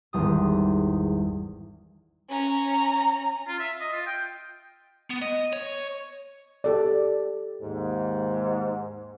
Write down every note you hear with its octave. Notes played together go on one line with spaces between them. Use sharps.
G#1 E2 G3 D#6
C#4 A#5
F4
E5
D#5
F4
G5
B3
D#5
C#5
G4 A4 D5
D#2 G#2